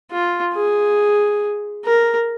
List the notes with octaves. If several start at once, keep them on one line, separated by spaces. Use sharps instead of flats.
F4
G#4
A#4